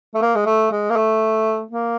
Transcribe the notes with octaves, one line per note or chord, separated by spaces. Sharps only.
A3
A#3
G#3
A3
G#3
A#3
A3
A#3